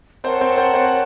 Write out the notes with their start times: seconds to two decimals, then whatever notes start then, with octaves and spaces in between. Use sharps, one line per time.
0.24 C4 A#4 C5 C#5 F#5 A5
0.41 C4 C5
0.58 C4 C5
0.74 C4 C5